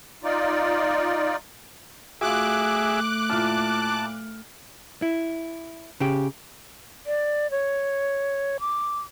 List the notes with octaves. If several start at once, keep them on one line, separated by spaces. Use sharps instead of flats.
D#4 F4 D5
A3 F4 F#4 G#4 E5 D6 F#6
A#2 E4 A5 F6
E4
C#3 G4
D5
C#5
D6